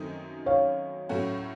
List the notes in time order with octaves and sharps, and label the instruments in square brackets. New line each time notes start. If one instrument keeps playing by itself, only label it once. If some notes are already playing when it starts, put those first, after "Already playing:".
Already playing: [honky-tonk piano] F#2 D#3 A3 C4 D#4
[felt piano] C#5 F5
[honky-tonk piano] A2 F#3 A3 C#4 F#4